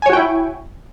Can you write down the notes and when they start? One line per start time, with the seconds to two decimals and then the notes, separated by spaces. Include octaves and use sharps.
0.02 G#5
0.06 C#5
0.10 F#4
0.13 G5
0.17 E4